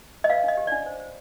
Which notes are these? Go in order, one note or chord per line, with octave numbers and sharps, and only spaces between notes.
D#5
B4 F5
D4 D#5
G4
D4 D5
C5
C5